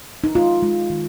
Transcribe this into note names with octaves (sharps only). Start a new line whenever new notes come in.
D#4
G#3 F4
G#3
D#3